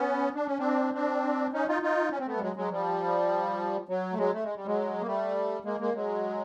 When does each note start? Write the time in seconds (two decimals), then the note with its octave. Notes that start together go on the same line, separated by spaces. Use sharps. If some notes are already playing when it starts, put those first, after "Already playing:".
Already playing: B3 C#4
0.35 D4
0.46 C#4
0.59 C4 D4
0.93 C4 D4
1.53 C#4 D#4
1.68 D#4 F4
1.82 D#4 F4
2.11 C#4
2.19 C4
2.26 A3 B3
2.37 G3
2.42 F#3 G#3
2.56 F#3 G#3
2.71 F3 G3
3.89 F#3
4.13 A3
4.18 F#3 G#3
4.33 A3
4.43 G#3
4.56 G3
4.66 F#3 G#3
5.01 A#3
5.06 G3 A3
5.65 G#3 A#3
5.80 G#3 A#3
5.94 F#3 G#3